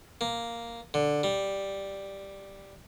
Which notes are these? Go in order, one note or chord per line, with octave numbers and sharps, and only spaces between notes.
A#3
D3
G3